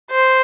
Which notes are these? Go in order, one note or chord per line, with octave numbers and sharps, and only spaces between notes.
C5